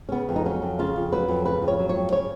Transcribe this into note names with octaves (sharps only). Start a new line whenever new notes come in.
C#4
C#3 B3
F2
D#4
F#3 C#4
F2
C#3 F4
F2
F#3 B4
F2
C#3 B4
F2
C#5
F#3
C#5
F2
C#3 C#5